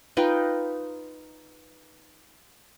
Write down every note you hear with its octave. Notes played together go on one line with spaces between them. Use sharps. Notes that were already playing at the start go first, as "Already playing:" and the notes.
D#4 F4 B4 G5